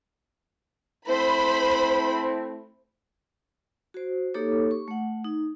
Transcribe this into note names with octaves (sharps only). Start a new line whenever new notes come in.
A3 C4 E4 C5 B5
F#4 C5
A#3 D#4 G4 A4 C#5 D6
C#6
A3 F#5
D#4